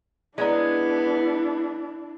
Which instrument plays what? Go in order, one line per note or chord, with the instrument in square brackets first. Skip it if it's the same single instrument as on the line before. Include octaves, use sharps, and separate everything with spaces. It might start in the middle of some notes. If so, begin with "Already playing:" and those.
[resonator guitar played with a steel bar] G#3 [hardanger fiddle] B3 [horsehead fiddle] D4 E4 [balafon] C#5 D5 A#5